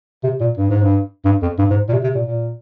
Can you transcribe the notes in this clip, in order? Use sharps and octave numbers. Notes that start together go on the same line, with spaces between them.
C3
A#2
G2
G#2
G2
G2
F2
G2
G#2
A#2
C3
C3
A#2
A#2